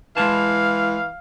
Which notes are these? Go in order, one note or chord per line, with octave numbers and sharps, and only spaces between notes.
E3 G#3 E4 F5 A5